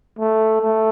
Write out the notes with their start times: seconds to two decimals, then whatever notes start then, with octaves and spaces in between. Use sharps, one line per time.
0.19 A3
0.61 A3